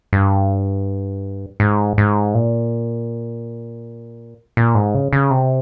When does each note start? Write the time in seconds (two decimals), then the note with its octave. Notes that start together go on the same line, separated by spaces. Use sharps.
0.13 G2
1.60 G#2
1.98 G#2
2.34 A#2
4.57 A#2
4.75 G#2
4.95 C#3
5.13 C#3
5.31 C3